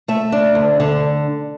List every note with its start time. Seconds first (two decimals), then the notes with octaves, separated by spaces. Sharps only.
0.08 A3 E5
0.32 D4
0.55 D2
0.80 D3